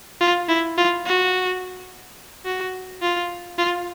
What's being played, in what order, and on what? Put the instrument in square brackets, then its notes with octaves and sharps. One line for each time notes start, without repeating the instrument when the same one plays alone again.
[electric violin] F4
E4
F4
F#4
F#4
F4
F4